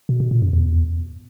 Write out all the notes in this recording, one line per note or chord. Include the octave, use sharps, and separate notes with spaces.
B2
B2
A#2
F#2
E2